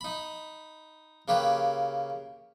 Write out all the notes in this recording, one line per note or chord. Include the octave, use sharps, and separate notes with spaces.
D#4 B5
C#3 A#3 G4 B4